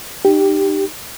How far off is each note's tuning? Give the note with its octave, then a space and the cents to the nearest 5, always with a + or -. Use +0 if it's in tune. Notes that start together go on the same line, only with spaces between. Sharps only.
D#4 -30 G4 +0